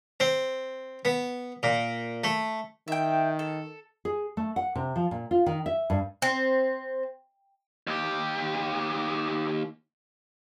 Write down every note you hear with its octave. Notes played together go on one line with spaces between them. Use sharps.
C4
B3
A#2
A3
D#3 E5 G5
A4
G#4
A3
F#5
C3
F3
A#2
F4
D#3
E5
G2
C4
D#2 G4